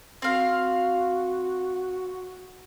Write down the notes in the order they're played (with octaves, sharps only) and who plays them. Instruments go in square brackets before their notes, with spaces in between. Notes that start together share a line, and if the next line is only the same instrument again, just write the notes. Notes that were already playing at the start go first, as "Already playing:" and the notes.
[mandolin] C4 F5 [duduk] F#4